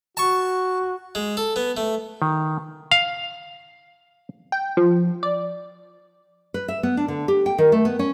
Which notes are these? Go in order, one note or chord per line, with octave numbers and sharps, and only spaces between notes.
F#4 A5 C#6
G#3
A4
B3
A3
D#3
F5
G5
F3
D5
B4
E5
B3
D4
D3
G4
G5
D#3
A3
B3
C#4